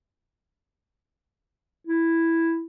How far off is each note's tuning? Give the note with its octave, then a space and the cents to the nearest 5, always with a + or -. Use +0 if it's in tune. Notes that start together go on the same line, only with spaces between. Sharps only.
E4 +0